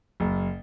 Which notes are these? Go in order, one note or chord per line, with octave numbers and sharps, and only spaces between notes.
F#1